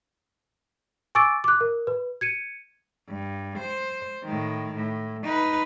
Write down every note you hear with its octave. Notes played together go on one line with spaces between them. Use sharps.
G#5 C#6 D6 E6 A6 D7
D6 F#6
A#4
B4
G#6 C#7 D#7
G2
C5
A2 D#3
A2
D#4 B4